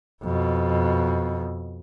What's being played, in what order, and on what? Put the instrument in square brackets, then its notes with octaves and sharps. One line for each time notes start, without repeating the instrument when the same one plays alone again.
[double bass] F2 B2